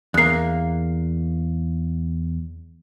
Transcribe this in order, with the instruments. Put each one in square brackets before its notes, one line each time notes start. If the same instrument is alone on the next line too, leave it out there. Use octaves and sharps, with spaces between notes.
[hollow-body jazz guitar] E2 A#3 [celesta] F#6 C7